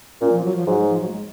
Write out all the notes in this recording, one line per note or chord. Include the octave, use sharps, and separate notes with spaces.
A#2 C#4
F3
F#3
F3
G#2 F#3
G#3
F3
F#3
A#3
G#3